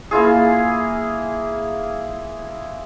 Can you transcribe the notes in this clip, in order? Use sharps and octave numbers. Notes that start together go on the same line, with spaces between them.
A#3 E4 F4 G#4